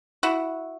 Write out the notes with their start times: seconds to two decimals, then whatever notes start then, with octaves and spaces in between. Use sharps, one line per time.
0.23 E4 F#4